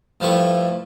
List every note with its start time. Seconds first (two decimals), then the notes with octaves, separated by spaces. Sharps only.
0.20 G2 F3 G3 A3 E4 C#6